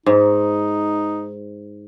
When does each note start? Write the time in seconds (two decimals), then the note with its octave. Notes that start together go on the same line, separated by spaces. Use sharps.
0.06 G#2 D#4